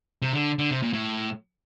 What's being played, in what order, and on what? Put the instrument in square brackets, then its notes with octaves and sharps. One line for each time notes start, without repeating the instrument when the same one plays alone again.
[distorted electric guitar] C3
D3
D3
C3
A#2
A2